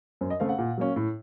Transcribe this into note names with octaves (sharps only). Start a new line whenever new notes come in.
F#2 C5
D#5
C#3 A3 C4 F5
F#5
A#2
F#3 A#3 C#4
A2